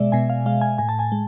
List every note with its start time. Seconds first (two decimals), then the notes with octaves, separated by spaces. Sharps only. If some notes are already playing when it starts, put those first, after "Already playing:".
Already playing: B2 G#3 D5 E5
0.12 B2 G#5
0.30 F5
0.46 G#3 F5
0.61 G#5
0.78 A2 G#5
0.89 A5
0.99 G#5
1.12 G#3